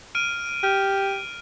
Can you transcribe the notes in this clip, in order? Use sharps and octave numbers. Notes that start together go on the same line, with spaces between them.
F6 D7 D#7
G4 F6